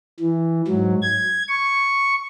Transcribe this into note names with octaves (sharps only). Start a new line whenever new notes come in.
E3
G#2 F#3
G#6
C#6